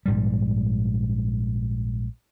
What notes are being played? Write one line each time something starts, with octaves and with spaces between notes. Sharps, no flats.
A#1 G#2 G3